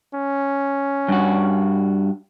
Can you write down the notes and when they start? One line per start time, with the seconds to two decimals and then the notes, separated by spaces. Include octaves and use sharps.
0.14 C#4
1.08 G2 F#4